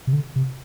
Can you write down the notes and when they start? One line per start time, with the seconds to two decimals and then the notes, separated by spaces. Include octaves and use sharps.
0.07 C3
0.13 D3
0.36 C3